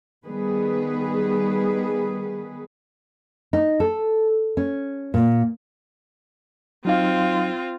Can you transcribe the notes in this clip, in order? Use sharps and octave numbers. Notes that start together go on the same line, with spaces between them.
D#3 G3 B3 G#4 B4
D#4
A4
C#4
A#2
F#3 C4 D#4 F4 F5